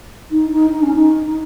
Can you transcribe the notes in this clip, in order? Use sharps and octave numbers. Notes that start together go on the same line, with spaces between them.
D#4
D#4
D#4
C#4
D#4